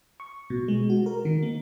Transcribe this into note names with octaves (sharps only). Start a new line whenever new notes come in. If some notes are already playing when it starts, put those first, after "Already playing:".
C#6
B2
G#3
F#4
A#4
D#3
A#3